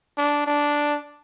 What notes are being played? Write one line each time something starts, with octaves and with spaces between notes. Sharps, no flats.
D4
D4